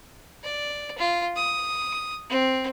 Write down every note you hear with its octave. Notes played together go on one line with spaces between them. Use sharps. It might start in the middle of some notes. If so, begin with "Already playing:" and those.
D5
F4
D#6
C4